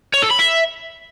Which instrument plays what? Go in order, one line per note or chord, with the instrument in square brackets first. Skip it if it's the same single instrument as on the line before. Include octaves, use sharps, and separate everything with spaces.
[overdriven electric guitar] C#5
A4
B5
E5